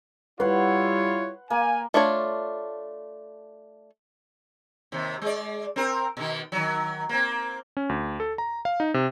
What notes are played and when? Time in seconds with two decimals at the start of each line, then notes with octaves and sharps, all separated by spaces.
0.40 G3 E4 F4 B4 C#5 F#5 C6
1.50 A#3 G#5
1.94 A3 D4 F4 C#5
4.92 D#2 C3
5.22 G#3 D5
5.76 C4 A#4
6.17 B2 D#3
6.52 D#3 F#3
7.09 A#3 C4
7.77 C#4
7.89 D2
8.20 A4
8.38 A#5
8.65 F5
8.80 D#4
8.94 C3